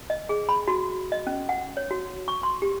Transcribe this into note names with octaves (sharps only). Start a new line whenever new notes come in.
D#5
G#4
B5
F#4
D#5
C#4
F#5
C#5
F#4
C#6
C6
G4